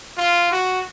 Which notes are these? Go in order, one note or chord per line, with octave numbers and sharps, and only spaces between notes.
F4
F#4